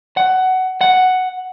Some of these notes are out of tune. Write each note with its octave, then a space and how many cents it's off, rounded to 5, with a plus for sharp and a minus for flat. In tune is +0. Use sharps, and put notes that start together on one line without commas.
F#5 +15
F#5 +0